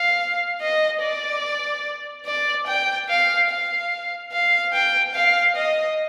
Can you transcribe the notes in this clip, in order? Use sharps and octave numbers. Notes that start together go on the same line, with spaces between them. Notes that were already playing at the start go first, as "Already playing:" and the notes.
Already playing: F5
D#5
D5
D5
G5
F5
F5
F5
G5
F5
D#5